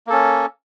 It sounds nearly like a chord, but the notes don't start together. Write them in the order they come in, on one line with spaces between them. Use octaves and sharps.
A#3 A4 C#4